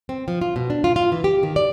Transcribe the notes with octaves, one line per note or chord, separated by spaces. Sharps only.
C4
F3
F4
B2
D4
F4
F4
E3
G4
D#3
D5